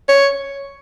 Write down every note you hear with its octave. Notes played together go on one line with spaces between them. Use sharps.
C#5